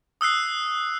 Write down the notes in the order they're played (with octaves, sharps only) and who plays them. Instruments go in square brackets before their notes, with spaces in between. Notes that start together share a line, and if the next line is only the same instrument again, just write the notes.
[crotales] D#6 E6 F#6 C7